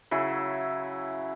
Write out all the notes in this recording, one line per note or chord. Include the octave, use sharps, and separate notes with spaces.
C#3 F#3 E4